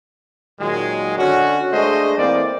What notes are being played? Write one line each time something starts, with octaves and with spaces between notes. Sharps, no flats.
A#2 D#3 F#3 G#3
D3 C#4 F#4
G#3 A3 D4 C5 D#5
E3 A#3 C4 D5